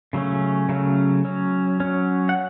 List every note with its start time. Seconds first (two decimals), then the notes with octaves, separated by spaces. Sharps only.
0.13 C#3 F#3 A3 C#4
0.69 C#3 F#3 A3 C#4
1.25 F#3 C#4
1.80 F#3 C#4
2.29 F#5